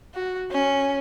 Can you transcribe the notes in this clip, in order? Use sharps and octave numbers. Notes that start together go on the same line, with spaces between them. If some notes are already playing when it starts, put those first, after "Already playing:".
F#4
C#4